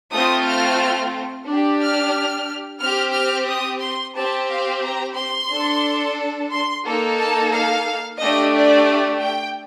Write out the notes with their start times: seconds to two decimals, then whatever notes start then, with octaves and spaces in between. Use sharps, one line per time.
0.12 A3 C4 F4 D#6
0.47 F6
1.47 D4 G4
1.81 F6
2.81 C4 G4 F6
3.16 F6
3.49 D#6
3.82 C6
4.16 C4 G4 A5
4.50 F5
4.84 A#5
5.17 C6
5.51 D4 A4
6.52 C6
6.85 A#3 D#4 A4
7.19 A5
7.53 F5
8.20 A3 D4 G4 D#5
8.54 D5
9.21 G5